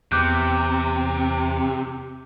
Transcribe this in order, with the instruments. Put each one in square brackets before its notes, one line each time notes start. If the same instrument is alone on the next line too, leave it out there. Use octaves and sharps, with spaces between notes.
[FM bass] E2 [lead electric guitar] C3 [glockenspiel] D6 F#6 G6